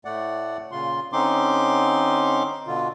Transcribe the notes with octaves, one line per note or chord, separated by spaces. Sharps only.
A2 A3 D5 F#5
A#2 C#3 F4 C6
D3 C4 C#4 D#4 C6 D6
B2 D3 F4